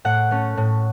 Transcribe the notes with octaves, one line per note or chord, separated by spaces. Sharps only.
A2 F#5
A3 C#4
A2